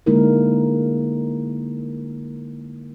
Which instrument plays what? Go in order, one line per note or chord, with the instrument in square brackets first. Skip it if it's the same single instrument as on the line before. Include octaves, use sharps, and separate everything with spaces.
[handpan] D3 G#3 A#3 D#4 E4 A#4